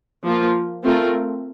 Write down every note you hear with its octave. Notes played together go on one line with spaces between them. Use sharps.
F3 A#3 F4
A3 C4 F4 A#4